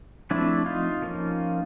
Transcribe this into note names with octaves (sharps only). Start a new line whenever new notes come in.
F3 A3 C4 D4 E4
D#4 F4
F3 A#3 C#4